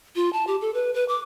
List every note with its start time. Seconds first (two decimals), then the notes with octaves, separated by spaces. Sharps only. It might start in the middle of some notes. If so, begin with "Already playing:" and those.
0.16 F4
0.33 A5
0.47 G4
0.61 A4
0.74 B4
0.94 B4
1.08 D6